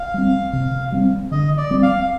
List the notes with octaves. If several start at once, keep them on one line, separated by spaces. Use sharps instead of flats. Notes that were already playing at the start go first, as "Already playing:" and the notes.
Already playing: F5
G3 C4
C3
G3 C4
D3 D#5
D5
G3 C4
F5